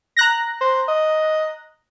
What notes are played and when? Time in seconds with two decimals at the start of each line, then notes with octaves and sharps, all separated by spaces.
0.17 A#5 F#6 A#6
0.61 C5
0.88 D#5